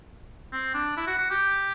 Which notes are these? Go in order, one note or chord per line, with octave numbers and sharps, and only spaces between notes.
C4
D4
E4
F#4
F#4
G4